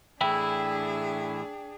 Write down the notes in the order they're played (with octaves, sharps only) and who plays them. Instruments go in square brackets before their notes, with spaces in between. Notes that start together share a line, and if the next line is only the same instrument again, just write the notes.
[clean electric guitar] A2 E3 E4 [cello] D4 G#4 [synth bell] G5